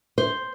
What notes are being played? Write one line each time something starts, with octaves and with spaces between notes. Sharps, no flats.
C5